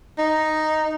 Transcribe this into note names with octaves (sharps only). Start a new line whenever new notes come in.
D#4